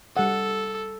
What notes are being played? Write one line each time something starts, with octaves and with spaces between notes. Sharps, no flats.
G3 A4 F#5